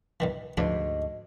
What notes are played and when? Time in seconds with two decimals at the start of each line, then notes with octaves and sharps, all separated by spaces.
0.20 G2 D#3 E3
0.57 D2 G#2 E3 F3 D4 D#5